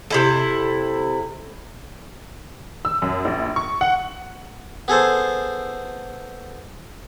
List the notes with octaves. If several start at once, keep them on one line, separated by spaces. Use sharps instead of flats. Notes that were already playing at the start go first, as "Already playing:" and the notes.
C3 E4 A4
E6
F#2
A#1
C#6
F#5
B3 G#4 A4 C5